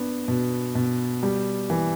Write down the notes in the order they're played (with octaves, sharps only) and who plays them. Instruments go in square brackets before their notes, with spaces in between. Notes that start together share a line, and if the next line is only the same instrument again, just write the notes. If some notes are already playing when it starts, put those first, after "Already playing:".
Already playing: [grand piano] B3 D4
B2
B2
G3
E3